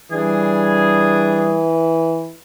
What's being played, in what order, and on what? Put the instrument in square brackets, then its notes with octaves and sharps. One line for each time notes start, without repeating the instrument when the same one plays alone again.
[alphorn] E3 [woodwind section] G3 D4 G#4